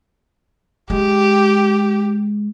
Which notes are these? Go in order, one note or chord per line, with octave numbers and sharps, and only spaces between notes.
G#3 G4